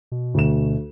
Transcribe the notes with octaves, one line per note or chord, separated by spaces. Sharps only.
B2
D2 E7